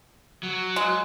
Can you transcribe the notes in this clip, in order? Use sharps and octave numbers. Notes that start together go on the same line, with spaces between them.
F#3
G#3